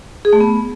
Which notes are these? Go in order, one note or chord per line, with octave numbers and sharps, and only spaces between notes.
G#4
A3
B3